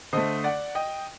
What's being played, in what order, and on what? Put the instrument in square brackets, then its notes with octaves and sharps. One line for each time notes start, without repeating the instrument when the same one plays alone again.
[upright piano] D3 A3 C5 D#5
D5 F#5
D#5 G5